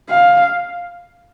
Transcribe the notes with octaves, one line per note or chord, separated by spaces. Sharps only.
F5